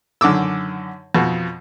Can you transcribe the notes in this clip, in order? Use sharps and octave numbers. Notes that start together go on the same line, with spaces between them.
F#2 D3 D#3 D6 E6
F2 B2